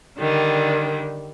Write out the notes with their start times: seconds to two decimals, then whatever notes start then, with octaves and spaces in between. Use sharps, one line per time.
0.19 D3 D#3 G3